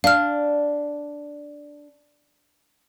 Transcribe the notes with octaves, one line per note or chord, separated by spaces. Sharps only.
D4 F5 F6